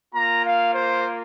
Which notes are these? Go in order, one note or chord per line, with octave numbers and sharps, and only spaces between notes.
A#3 F4 A#5
F5
C5